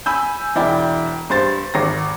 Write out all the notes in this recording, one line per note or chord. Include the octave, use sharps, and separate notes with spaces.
G#5 B5 E6 G6
E1 E4 D5 G5
G2 C5 A6
G#1 A#6